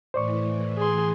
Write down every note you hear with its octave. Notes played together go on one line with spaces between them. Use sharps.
A2 E3 C5 D5 C#6
G#4 C6